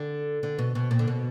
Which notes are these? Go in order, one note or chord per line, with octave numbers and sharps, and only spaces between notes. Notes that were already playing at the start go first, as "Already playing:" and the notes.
Already playing: D3
D3
B2
B2
A#2
D3
B2